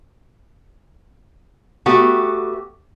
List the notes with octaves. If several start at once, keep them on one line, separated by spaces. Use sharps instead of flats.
A3 B3 F#4 G4